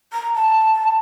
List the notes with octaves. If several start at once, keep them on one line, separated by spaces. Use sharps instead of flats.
A#5
A5